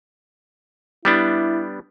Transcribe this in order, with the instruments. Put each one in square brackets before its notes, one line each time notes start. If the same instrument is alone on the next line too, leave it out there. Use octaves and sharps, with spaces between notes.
[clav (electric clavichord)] G3 B3 D4 [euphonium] E4